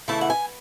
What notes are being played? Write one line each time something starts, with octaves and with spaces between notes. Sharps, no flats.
C#3 E3 A3 E4 A5
F#5
G#5